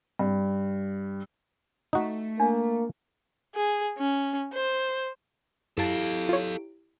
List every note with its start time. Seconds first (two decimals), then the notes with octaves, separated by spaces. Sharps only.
0.19 G2
1.93 A3 D#4 F#4
2.40 A#3 D4
3.55 G#4
3.98 C#4
4.53 C5
5.77 F#2 E4 G4 A4 F5 A5 D7
6.29 F4 C#5